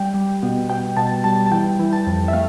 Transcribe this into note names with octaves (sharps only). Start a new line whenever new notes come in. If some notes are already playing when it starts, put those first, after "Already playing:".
Already playing: G3 G5
G3
B2
B2 G5
B2 A5
G3 A5
A5
E3 G5
E3
A5
F2
E5
A3 F5